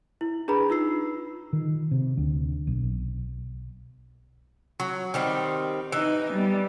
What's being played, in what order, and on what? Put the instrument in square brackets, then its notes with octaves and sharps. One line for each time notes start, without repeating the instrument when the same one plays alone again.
[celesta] E4
D4 G#4 B4 A#5 B5
D#4 F4 E6 C7
[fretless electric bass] D#3
C3
D2
B1
[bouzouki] F#3
D#3 G3 C4
[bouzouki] E3 [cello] D#4
[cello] G3 B3